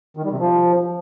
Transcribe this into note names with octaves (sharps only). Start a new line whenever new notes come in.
D#3
G3
C3
F3